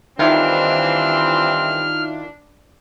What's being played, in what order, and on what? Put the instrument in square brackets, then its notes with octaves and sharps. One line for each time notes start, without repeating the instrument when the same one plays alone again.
[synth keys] D#3 E4 F4 [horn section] E3 G3 C4 [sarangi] D4 [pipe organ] F6